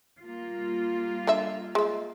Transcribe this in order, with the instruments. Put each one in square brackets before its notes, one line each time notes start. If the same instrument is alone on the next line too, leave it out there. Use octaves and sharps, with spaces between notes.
[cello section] G3 A#3 F4
[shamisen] D3 D#5 E5
G#3 E5